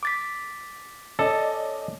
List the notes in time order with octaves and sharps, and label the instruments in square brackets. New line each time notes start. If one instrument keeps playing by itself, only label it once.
[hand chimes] D6 A6 B6
[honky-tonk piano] C#4 D5 D#5 [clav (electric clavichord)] A4